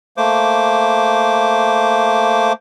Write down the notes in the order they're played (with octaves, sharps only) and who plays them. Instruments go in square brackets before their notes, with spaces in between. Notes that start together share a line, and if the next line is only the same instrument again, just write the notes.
[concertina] A3 A#3 C5 D6